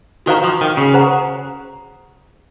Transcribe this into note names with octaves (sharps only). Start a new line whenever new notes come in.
D#3 F#4 C5 F5 A#5 C#6
F3
D#3
C#3
G#4 C5 F#5 A#5